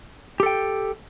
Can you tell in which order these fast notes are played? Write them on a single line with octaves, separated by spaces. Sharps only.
G4 A4 G5